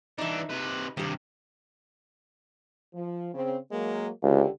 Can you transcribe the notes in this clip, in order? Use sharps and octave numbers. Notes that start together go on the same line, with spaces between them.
E3 D4 D#4 E5
C3 B4
G2 C3 D#3 G4
F3
C#3 C4
F#3 G#3 A#3
C#2 D3 G4